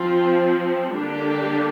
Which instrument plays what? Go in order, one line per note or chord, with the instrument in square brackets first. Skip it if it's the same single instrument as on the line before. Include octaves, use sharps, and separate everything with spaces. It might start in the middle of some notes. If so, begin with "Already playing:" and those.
Already playing: [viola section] F3 C4 F4
D3 G3 A#3 D4 G4